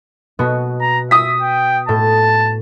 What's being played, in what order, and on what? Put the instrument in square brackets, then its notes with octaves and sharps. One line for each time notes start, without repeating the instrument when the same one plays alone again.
[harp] B2 B3 F#4
[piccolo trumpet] A#5
[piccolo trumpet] E5 [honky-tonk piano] D#6 B6
[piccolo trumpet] G5
[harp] A2 G6 [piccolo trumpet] A5